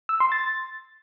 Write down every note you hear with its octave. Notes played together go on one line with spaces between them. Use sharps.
E6
C6
A6